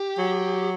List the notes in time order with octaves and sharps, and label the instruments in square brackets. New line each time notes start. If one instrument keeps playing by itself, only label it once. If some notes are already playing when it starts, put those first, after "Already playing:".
Already playing: [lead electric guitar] G4
[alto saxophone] F#3